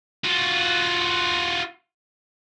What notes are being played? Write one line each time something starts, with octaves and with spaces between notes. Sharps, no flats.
F4 F#4